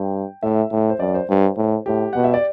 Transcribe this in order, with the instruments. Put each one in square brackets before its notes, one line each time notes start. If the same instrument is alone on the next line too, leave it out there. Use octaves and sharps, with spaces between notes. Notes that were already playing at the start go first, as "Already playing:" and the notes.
Already playing: [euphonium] G2 [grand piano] G5
[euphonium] A2 [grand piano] E5
[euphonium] A2
[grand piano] C5
[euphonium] F#2 [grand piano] D5
[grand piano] C5
[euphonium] G2 [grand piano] C5
[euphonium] A2
[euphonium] A2 [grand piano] G4
[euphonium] B2 [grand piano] F#5
[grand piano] E5
D5